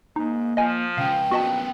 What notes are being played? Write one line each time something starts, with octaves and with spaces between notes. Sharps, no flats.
G#2 A#3 D#4
F3 D#5 G#5
C#2 C#3 F5 G5
A#1 B3 C#4 F#4 D#5 A5